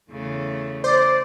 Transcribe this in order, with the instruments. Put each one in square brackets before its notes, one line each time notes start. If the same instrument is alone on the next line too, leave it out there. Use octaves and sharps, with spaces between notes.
[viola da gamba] E2 C#3 A3
[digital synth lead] C5 [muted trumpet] D5